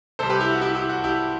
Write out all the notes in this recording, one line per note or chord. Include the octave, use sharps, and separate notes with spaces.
C2 C3 G3 A4 C5
G4 B4
E4 G4
F#4
E4 G4
E4 G4
F#4
E4 G4